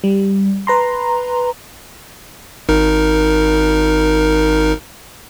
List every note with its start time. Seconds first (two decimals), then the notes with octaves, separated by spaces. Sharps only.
0.04 G3
0.67 B4 A#5 C6
2.69 G#1 D#4 A#4